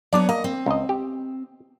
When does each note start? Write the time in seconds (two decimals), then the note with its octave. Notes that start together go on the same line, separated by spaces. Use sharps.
0.13 F#3 B3 D4 C#5 D5
0.29 A#3 D#5
0.44 C4
0.66 C#2 D#5
0.89 G4